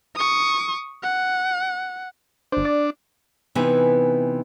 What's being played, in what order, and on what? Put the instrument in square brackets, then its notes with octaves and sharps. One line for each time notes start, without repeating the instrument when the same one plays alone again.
[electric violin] C#6 D#6
F#5
[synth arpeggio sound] G1 C5 [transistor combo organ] D4
[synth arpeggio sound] D5
[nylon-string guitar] C3 E3 B3 D#4 B4 G#5